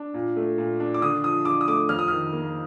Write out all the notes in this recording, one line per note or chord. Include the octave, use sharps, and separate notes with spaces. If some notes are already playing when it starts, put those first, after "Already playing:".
Already playing: D4
A#2
A3
A#2
D4
D6
D3 D#6
F3 D#6
D3 D6
D#6
A3 D6
F2 F6
D#6
D#3 F6
A#3